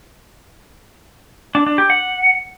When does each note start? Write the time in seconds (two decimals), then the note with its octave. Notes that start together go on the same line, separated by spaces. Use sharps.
1.55 D4
1.66 D4
1.78 G4
1.90 F#5